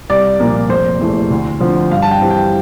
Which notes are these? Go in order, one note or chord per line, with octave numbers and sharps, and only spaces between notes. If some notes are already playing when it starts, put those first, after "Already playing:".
C2 D5
A#2 F3 A#3
F1 C5
E2 E3 A3
D2
D3 F3 C4
G2 F5
A5
G5
E3 G3 C4
G5